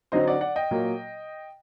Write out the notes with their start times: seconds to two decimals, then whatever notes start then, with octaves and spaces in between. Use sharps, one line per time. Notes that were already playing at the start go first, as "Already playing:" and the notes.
0.12 D3 F#3 C4 D#4 C5 D#5
0.28 D5 F#5
0.41 D5 F#5
0.56 D#5 G5
0.71 A#2 F#3 A#3